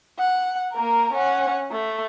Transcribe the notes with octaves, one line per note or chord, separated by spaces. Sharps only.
F#5
A#3 A#4
C#4 F#5
A3